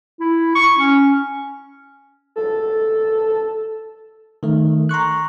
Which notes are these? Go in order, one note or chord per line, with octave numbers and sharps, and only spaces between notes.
E4
C#6
C#4
A4
D#3 A3
A#5 C6 C#6 F#6